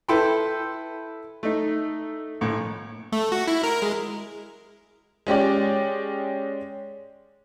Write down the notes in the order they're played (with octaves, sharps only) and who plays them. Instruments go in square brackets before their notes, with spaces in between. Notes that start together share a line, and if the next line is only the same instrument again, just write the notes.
[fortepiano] E4 A4 B4 G5 B5 C6
A3 D#4
A#1 A2
[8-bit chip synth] A3
F#4
E4
A#4
G#3
[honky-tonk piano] G#3 C#4 G4 D5